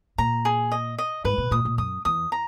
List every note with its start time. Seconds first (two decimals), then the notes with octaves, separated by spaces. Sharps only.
0.18 A#2 A#5
0.45 G#4
0.72 D#5
0.98 D#5
1.25 G#2 B4
1.38 B2
1.51 A#2 D#6
1.65 A#2
1.78 F#2 D#6
2.05 E2 D#6
2.32 A#5